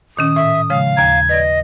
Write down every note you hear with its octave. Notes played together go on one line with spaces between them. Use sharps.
A#2 D#3 C#4 D#6
A2 E5
C#3 F3 G#3 F5
D#2 A#5 G#6
B4 D5 D#5